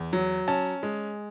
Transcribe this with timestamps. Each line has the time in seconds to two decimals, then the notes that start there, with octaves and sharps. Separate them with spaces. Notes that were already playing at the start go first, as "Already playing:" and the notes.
Already playing: E2
0.13 F#3
0.48 C#4 A5
0.83 G#3